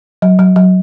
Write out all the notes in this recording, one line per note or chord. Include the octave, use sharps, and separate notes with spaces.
F#3
F#3
F#3